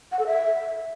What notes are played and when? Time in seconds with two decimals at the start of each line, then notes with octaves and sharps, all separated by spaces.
0.12 F#5
0.19 A4
0.26 E5